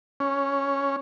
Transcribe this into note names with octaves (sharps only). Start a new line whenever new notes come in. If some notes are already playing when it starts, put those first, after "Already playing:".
C#4